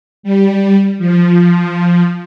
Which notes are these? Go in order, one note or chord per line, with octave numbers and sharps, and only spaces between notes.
G3
F3